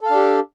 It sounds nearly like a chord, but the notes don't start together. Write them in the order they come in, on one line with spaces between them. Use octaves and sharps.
A4 F5 D4 G4